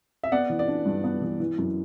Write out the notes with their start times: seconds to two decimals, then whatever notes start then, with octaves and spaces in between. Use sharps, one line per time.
0.23 E5
0.32 B3 D5 F#5
0.50 E3
0.59 D5
0.68 D4
0.86 G2
1.04 B3
1.22 E3
1.40 E3
1.58 F#2